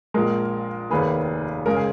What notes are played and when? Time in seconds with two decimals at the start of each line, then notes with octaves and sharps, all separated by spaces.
0.14 A#1 A#2 G#3 A#4
0.90 F1 D#2 D#3 A#3 G#4 B4
1.66 C#3 G#3 C#4 A#4
1.76 G#4